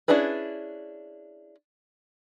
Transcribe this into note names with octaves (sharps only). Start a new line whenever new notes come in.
C#4 D4 E4 G#4 B4